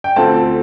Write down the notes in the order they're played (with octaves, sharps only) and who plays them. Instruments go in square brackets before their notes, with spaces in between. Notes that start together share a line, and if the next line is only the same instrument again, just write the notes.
[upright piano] G5
D2 D3 A3 C4 F4 A5